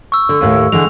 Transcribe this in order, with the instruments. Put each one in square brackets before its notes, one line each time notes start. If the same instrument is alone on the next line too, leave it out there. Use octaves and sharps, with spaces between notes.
[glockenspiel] C#6 E6
[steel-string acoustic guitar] D3
D#2 A2
[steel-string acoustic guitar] D3 E3 G#3 [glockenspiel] F7